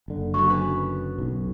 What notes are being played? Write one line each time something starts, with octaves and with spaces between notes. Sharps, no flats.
F#1 D3
F#2 F#4 C#6
C#4 D4 B4
B1